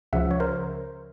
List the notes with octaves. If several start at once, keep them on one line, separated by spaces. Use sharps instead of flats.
C#2 C#3 F3 E5 F#5
C#5
A#4 C5